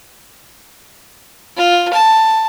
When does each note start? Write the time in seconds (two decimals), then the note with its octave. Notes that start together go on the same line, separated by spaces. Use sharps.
1.57 F4
1.93 A5